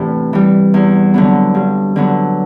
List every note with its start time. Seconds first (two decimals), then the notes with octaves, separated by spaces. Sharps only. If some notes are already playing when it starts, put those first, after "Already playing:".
Already playing: E2 A2 C3 E3 D4
0.33 E3 G3
0.74 E2
1.14 D3 F#3 B3
1.55 G2
1.96 D3 F#3 B3